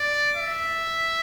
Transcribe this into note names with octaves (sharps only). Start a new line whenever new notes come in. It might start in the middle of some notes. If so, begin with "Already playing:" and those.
Already playing: D5
E5